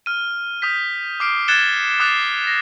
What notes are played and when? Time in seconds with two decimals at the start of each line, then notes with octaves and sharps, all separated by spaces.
0.06 F6 D#7
0.62 D#6 G6 B6
1.20 D6 F6 C7 D7
1.48 F#6 G#6 A6 C#7 E7 G7
2.00 D6 D#6 F#6 A6 C7
2.44 A#6 C7